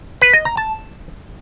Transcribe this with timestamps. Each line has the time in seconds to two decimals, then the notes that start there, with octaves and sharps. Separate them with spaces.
0.22 B4
0.33 D#5
0.45 A#5
0.57 A5